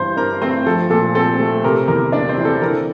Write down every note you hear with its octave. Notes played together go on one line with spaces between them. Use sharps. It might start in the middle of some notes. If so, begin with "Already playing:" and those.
Already playing: G2 E3 C5 C6
D4 A#4 A#5
A3 C4 C5
F3 A4
A#2 A4
C4 A4
A3
C3 A#4
E2 A#4
A#3 D4 D5
C4 C5
E3
A4
E3 A#4